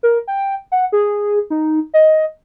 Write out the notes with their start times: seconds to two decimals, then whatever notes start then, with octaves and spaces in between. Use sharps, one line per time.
0.03 A#4
0.28 G5
0.72 F#5
0.92 G#4
1.50 D#4
1.94 D#5